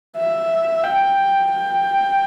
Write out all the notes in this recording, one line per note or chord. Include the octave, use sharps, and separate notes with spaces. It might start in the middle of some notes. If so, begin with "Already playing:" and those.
E5
G5
G5